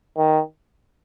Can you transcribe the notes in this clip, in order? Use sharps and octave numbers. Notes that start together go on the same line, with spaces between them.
D#3